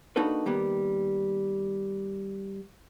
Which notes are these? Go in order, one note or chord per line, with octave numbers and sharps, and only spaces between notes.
A#3 D4 D#4 F#4 A4 B4
D#3 G3 A#3 B3